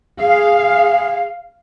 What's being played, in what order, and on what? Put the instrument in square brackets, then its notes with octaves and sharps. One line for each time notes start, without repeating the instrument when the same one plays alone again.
[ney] G#4 [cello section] F5